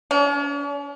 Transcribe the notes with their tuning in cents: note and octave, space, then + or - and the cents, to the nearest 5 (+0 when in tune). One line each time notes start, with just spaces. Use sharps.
C#4 +45